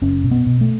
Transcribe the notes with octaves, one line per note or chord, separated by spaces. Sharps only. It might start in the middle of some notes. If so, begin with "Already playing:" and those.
F#1 C#4
B2
B3
B2
A3